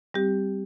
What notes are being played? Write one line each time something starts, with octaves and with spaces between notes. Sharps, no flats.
G3 C4 G4